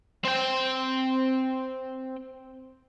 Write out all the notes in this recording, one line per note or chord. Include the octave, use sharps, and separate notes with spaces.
C4 G5